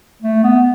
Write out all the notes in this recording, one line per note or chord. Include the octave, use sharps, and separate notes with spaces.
A3
B3